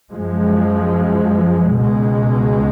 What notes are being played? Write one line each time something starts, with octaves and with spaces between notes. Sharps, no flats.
F#2 F3 G#3
C#2 B2 G#3